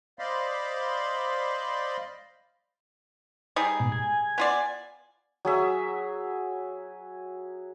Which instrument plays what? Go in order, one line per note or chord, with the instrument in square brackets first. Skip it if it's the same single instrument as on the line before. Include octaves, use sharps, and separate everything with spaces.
[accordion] C5 D5 D#5 F5 B5 C6
[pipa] G3 D#4 G#4
[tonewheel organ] G#2 B2
G#5
[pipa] B3 F4 D5
[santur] F#3 G#4 E5